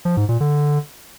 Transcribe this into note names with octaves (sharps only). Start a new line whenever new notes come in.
F3
G#2
A#2
D3